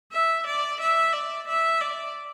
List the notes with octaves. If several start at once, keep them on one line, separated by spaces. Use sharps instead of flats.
E5
D5
E5
D5
E5
D5